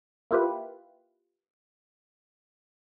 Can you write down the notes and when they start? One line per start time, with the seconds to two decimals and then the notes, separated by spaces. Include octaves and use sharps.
0.31 A#3 E4 F4 G4 B4